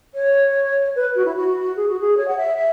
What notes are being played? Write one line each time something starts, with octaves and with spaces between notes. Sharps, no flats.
C#5
B4
F#4
E4
F#4
G#4
F#4
G#4
C#5
F#5
E5
E5